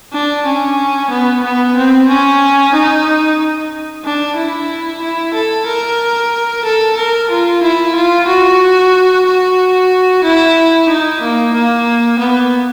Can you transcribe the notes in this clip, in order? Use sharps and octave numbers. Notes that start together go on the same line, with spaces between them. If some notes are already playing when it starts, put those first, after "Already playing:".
D4
C#4
B3
B3
C4
C#4
D#4
D4
E4
E4
A4
A#4
A4
A#4
F4
E4
F4
F#4
F#4
E4
D#4
A#3
A#3
B3